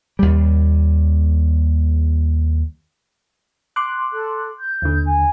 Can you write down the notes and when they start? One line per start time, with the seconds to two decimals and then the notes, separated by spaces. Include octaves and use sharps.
0.19 D#2 G3
3.76 C6 D6 F#6
4.12 A4
4.59 G6
4.82 D#2 D3
5.05 G#5